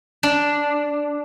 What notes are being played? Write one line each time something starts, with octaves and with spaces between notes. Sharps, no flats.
D4